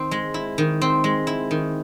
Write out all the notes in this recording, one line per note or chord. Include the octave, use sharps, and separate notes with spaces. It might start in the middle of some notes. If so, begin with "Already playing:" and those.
Already playing: D#3 C4
G#3
E4
D#3
C4
G#3
E4
D#3